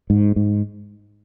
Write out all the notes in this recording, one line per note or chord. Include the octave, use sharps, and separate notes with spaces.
G#2
G#2